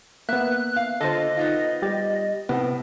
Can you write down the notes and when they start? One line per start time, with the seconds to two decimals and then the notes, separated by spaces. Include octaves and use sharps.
0.29 A#3 B3 E5 F#6
0.76 F5
1.01 D3 F4 A4 C5 D#5
1.37 B3 D#4 F4
1.82 G3 G4 A6
2.49 A2 C3 B3